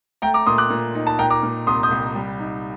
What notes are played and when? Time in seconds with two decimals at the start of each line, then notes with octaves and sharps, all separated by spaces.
0.22 A3 G5 A#5
0.34 A#5 D6
0.46 A#2 C6 D#6
0.58 D6 F#6
0.70 A#2
0.95 D#4
1.07 A5
1.19 A#2 G5 A#5
1.30 A#5 D6
1.43 A#2
1.67 C2 C6 D#6
1.83 D#6 G6
1.91 C2
2.15 G3
2.39 D#4